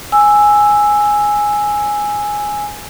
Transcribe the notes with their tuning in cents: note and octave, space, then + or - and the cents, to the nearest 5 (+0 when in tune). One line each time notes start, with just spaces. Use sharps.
G#5 +0 E6 +0